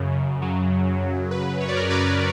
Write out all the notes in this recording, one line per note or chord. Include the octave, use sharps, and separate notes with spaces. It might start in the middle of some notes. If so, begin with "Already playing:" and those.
Already playing: F#2 C#3
C#3
F#3
C#3
F#2
F#2 B4
F#2 C#5
D5
A#4 C#5
C#3 B4 D5